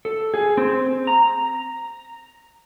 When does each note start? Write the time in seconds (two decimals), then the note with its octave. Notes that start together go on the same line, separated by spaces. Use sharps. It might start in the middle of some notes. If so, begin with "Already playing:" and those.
0.05 A4
0.34 G#4
0.57 C4
1.07 A#5